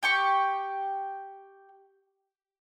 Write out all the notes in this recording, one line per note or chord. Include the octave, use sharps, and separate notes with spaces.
G4 G5 C#6